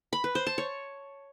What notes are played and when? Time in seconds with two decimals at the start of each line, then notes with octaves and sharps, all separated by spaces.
0.13 B5
0.24 B4
0.35 C5
0.47 A5
0.58 C#5